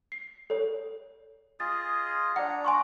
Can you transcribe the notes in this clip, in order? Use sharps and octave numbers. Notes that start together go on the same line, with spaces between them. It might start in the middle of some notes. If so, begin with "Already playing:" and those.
C7
A4 C#5
F4 G#4 D#5 A6
D4 D5 F#5 A#5
G#5 C6 C#6